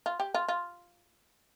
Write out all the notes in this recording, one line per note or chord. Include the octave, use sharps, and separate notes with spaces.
F4
G4
F4
F4